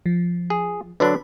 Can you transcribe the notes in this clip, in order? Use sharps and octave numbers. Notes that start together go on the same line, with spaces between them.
F3
G#4
D3 F#3 D4 B4 B5